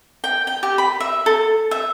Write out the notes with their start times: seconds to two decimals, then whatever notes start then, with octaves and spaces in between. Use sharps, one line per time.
0.24 G5
0.47 G5
0.63 G4
0.78 B5
1.00 E5
1.26 A4
1.71 E5